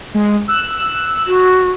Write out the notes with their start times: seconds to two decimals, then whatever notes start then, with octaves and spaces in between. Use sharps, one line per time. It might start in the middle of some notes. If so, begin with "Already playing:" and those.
0.14 G#3
0.48 E6 F#6
1.27 F#4